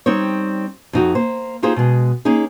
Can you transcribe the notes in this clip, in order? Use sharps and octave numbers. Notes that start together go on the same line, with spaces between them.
G3 C4 D#4 C#5
F2 D#4 F#4
A#3 C5
A#3 D#4 F4 G4 G#4 C5
B2 G#3
A#3 C#4 D#4 G#4